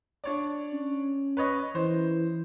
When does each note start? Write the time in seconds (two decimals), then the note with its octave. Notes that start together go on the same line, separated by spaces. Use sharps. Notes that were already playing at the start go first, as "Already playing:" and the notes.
0.24 D4 C#5 D5
0.73 C#4
1.37 B4 C#5 D#5
1.75 E3 C5